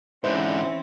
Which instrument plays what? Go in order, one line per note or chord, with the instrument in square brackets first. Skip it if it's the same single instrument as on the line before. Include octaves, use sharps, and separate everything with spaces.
[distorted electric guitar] G#2 D3 [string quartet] E3 C4 C#4 [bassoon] E4 [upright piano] C5